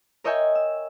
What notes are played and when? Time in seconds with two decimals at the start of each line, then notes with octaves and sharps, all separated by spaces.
0.24 A#4 C#5 D#5 E5 G5 G#5
0.55 E6